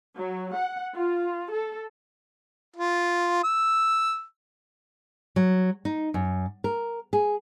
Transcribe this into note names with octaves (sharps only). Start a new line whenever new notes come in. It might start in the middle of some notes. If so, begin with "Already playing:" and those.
F#3
F#5
F4
A4
F4
E6
F#3
D#4
F#2
A#4
G#4